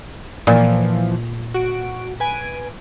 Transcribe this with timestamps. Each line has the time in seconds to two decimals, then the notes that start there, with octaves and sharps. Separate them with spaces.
0.47 A#2 E3 F3
1.54 F#4 D7
2.20 B4 G#5 D7